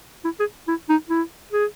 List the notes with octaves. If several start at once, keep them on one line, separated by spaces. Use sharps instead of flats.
E4
G#4
E4
D#4
E4
G#4